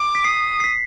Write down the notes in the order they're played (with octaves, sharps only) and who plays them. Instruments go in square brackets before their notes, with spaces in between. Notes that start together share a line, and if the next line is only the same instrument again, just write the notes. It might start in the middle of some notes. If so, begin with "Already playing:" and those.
Already playing: [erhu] D6
[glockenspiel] B6
[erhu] D#6 [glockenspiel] C7
[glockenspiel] C7
B6